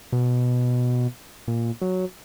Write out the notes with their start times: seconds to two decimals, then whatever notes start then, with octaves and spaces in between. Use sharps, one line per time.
0.12 B2
1.48 A#2
1.81 F#3